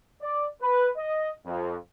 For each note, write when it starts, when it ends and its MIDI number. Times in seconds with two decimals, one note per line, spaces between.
0.21 0.46 74
0.61 0.88 71
0.97 1.30 75
1.46 1.75 41